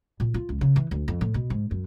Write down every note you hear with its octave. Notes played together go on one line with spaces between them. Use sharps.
A#2
F4
C#2
C#3
E3
D2
F2
A2
B2
G#2
F#2